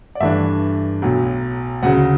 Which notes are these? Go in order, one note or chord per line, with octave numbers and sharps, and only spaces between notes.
D5
G2 E3 A3 D4 E5
B1 A2 F#3
D2 C#3 F#3 F#5